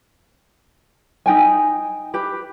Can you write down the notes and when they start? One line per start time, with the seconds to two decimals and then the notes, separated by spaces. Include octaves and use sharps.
1.26 D#4 G5 G#5
2.14 G4 B4